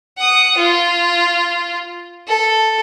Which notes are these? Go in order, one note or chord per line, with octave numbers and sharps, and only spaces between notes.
F#5 D#6
F4
A4